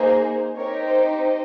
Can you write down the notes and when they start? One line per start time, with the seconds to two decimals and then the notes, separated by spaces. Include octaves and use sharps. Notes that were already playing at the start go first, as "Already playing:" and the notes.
Already playing: A#3 D#4 G#4 C5
0.55 C4 D#4 G4 A#4 C#5
0.85 C5
1.14 C5 D#5